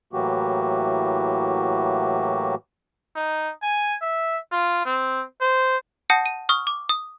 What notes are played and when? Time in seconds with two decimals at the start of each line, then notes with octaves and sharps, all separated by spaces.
0.13 A2 E3 F#3 A#3 F#4 G4
3.15 D#4
3.62 G#5
4.01 E5
4.52 F4
4.85 C4
5.41 C5
6.10 F#5 A5 D#6 G6 A#6 C#7
6.26 D#7
6.49 C#6 D#6 F6
6.67 D6
6.89 D#6